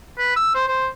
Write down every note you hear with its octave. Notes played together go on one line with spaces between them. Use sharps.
B4
E6
C5
C5